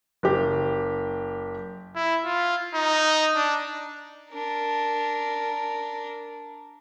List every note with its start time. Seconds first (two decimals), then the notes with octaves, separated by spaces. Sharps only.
0.23 F#1 G4
1.96 E4
2.25 F4
2.74 D#4
3.36 D4
4.31 D4 A#4